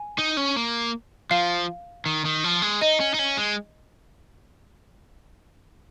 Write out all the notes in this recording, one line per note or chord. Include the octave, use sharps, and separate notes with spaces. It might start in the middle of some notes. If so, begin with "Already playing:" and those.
Already playing: G#5
D#4
C#4
A#3
F3 F5
D#3
D#3
F3
G#3
D#4 D#5
C#4
D#4
C#4
G#3